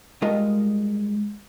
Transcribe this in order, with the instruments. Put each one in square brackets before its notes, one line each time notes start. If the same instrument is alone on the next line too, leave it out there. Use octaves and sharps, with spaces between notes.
[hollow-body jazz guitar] G3 G#3 F4 A#4 D#5